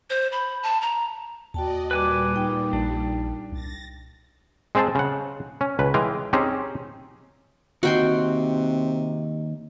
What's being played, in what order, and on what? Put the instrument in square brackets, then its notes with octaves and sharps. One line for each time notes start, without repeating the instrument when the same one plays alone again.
[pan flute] C5
B5
A5
A#5
[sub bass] D#2 [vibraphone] F#4 G5 A5 [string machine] D5 D#5
[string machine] A#2 G3 [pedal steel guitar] B4 G#5 D6
[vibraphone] D#4 G5
[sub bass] A#1 [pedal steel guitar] D4
[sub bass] C2 [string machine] A6 A#6
[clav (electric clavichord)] G#3 C4 G#4 C5 A5
C#3 F#5
C#4
C#2 B4
E3 G#3 F5 G5 G#5
C4 C#4 D#4 G4 G#4 C5
[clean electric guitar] D#2 D#4 [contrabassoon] C3 [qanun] F#4 G5 C6